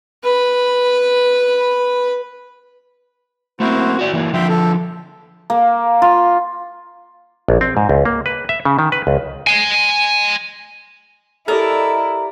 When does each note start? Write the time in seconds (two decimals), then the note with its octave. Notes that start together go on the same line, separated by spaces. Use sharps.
0.23 B4 B5
3.60 A3 A#3 C4 E4 F#4 C5
3.99 A2 F#4 D5
4.13 E3 A#3
4.34 D3 F3 E5 G5 C6
4.49 A4
5.50 A#3
6.02 F4
7.48 A#1
7.61 C4
7.77 G#2
7.89 C#2
8.05 A#3
8.26 B4
8.49 E5
8.65 C#3
8.79 D#3
8.92 B4
9.07 C#2
9.47 G#5 C6
11.48 E4 G4 A4 A#4 D5 D#5